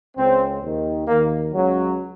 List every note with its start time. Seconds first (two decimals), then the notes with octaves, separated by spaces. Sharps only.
0.17 C#2 C#3 C4
0.62 D#2 D#3
1.07 D#2 D#3 A#3
1.53 C#2 C#3 F#3